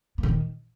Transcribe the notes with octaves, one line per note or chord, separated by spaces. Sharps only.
A#2
D3
D#3